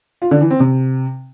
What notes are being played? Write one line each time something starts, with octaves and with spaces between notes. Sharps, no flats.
F4
D3
E3
C4
C3